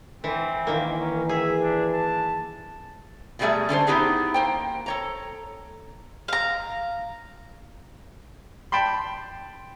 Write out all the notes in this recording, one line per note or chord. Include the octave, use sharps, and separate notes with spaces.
E3 C4
D#3 E3 A#3
C#4
G#4 E5
D4
A5
B2 F#3 G3 A3 G#4 E5
D3 C#4 D4 C5
B3 D#4 E4 G4 G#4 B4
A#3 C5 G5
A4 C#5 A#5
F5 A#5
G5 A5 B5 C6